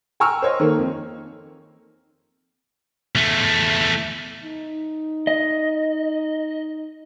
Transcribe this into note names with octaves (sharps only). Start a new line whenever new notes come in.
G5 G#5 A#5 C#6 E6 F6
C5 C#5 D#5
D#3 A#3 A4
F2
E2 A3
D#4
D#5